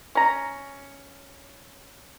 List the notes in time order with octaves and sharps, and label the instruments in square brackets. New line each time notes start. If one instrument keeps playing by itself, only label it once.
[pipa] C#4 A#5